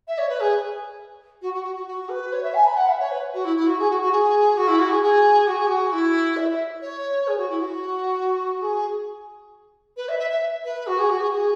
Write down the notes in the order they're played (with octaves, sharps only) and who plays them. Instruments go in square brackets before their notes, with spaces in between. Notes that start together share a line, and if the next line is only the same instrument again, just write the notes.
[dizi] E5
C#5
B4
G#4
F#4
F#4
F#4
F#4
F#4
B4
C#5
E5
G#5
B5
G#5
F#5
E5
C#5
B4
F#4
E4
E4
F#4
G#4
F#4
F#4
G#4
F#4
E4
F#4
G#4
G#4
F#4
G#4
F#4
E4
E5
C#5
G#4
F#4
E4
F#4
G#4
B4
E5
E5
E5
B4
F#4
G#4
F#4
G#4
G#4